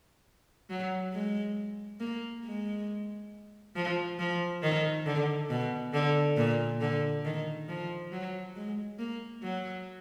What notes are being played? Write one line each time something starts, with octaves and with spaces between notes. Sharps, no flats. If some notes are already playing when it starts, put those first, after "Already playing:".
F#3
G#3
A#3
G#3
F3
F3
D#3
D3
B2
D3
A#2
D3
D#3
F3
F#3
G#3
A#3
F#3